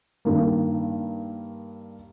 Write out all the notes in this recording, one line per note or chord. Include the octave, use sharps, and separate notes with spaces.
G2 D#3 A#3